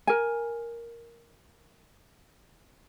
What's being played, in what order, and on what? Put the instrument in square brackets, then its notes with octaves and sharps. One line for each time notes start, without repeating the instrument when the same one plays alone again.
[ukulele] A#4 G#5